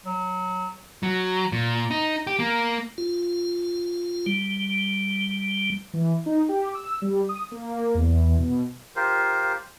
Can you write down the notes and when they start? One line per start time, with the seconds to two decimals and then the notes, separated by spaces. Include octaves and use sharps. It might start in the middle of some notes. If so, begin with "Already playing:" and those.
0.06 F#3
1.03 F#3
1.52 A#2
1.91 D#4
2.27 G4
2.39 A#3
2.98 F4
4.26 G3
5.94 E3
6.26 D#4
6.49 G4
6.75 E6
7.02 G3
7.29 D#6
7.52 A#3
7.95 E2
8.39 B2
8.96 F4 G4 A#4 C5